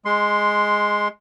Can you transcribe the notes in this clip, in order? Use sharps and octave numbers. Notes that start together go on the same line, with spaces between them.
G#3 C6